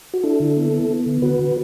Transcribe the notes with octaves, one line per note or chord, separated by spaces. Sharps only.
F#4
D4 E4 A4
D3
B3
B3
B3
D3
D3 F#4 B4
D3